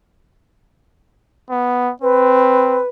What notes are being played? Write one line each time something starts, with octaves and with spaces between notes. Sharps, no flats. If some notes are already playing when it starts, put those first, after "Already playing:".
B3
C4 B4